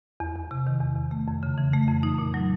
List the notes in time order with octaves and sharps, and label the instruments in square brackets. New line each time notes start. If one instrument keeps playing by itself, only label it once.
[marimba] E2
E2
C3
D#3
E2
E2
A3
F2
C#3
E3
A3
F2
D#4
A#2
F#3